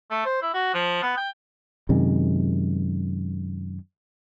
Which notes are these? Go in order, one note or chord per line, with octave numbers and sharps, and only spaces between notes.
A3
C5
E4
F#4
F3
B3
G5
F#2 C3 D#3 G#3